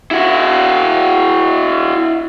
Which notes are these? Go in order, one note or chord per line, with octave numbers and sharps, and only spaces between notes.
E4 F#4